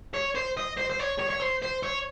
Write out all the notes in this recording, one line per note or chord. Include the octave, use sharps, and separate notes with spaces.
C#5
C5
D#5
C5
C5
C#5
C#5
C#5
C5
C5
C#5